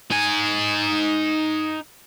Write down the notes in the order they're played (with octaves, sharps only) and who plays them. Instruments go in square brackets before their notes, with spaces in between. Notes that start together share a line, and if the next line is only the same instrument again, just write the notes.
[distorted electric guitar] D#4 G#5